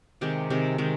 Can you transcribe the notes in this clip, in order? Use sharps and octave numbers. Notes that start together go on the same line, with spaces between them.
C3 D#3 G#3 G4
C3 D#3 G#3
C3 D#3 G#3